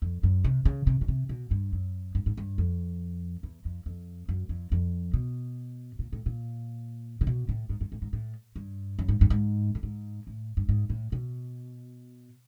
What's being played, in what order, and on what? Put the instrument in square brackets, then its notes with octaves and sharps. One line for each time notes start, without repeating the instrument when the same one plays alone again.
[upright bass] F2
F#2
C3
C#3
C3
B2
C3
B2
G2
F#2
G2
G#2
G2
F2
E2
F2
F2
F#2
F2
F2
B2
A#2
A2
A#2
C3
B2
A2
G#2
G2
A2
G#2
A2
G2
F#2
G#2
G2
G#2
A2
G#2
A2
G2
G#2
A2
B2